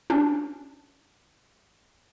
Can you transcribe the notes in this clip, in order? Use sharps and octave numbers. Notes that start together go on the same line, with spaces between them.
C#4 D4